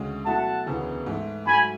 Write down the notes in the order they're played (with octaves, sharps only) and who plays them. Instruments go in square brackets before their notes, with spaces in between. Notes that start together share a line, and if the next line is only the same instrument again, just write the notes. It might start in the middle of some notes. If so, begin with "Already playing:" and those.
Already playing: [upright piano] D2 C#3 G#3
[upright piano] B2 F#3 A3 E4 [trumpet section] F#5 A5
[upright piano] E1 D2 C#3 E3 B3
G#2 E3 A3 E4
[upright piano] G#2 F#3 A3 [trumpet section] G#5 B5